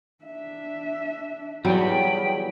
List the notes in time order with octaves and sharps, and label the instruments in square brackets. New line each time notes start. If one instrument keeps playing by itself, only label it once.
[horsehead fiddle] D4 E5
[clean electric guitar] E2 E3 [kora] F#3 G3 F#4 [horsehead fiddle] G#4 B5 [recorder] G5